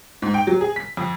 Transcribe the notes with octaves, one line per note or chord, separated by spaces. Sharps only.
G#2
G5
F#3
G#4
B6
F2